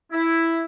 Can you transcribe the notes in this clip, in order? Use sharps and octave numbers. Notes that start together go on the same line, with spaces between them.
E4